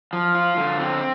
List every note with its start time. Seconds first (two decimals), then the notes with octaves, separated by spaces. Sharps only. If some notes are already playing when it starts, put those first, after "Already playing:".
0.13 F3
0.35 F4
0.57 D3
0.80 C4